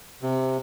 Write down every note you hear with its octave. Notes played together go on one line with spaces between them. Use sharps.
C3